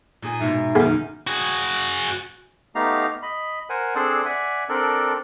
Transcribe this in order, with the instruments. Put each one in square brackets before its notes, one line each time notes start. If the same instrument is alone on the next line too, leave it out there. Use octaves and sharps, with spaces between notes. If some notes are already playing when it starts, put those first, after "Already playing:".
[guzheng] A#2 G#4 G#5
[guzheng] G#2 B2 [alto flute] E5
[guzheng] F#2 D#3 [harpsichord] A#3 B3 G#4
[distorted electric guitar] F#4 G#4
[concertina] A3 B3 D#4 G4 F5 A#5
D#5 B5
A#4 C5 F#5 G#5
C4 D4 G#4 A4 C5 D5
D5 E5 F#5 G#5
C4 D4 A4 A#4 D5